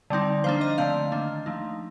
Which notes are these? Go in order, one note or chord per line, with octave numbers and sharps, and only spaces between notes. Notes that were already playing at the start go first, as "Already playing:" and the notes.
D3 G3 C4 D#4
F3 A#3 D4 C5
D#5
D3 A3 C4 F5
D#3 A#3 D4
F3 A3 D#4